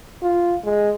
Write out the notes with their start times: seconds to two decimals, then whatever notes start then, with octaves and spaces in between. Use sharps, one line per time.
0.22 F4
0.65 G#3